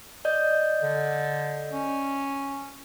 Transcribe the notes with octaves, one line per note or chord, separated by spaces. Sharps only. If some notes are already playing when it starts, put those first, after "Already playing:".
D5 D#5 G6
D3
C#4